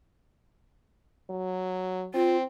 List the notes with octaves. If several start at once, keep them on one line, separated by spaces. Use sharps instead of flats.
F#3
C4 F4